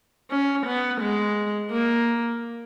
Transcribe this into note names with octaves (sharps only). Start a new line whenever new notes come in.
C#4
B3
G#3
A#3